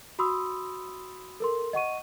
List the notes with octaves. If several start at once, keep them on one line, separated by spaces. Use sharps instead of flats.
F#4 B5 C6 D#6 E6
A4 A#4 C6
D#5 F#5 C#6 D#7